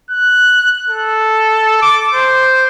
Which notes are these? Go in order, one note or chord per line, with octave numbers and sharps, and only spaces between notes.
F#6
A4
D6
C5